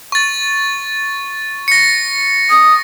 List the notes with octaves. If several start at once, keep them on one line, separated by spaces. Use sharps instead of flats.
C#6 A6
A#6 C#7
D#6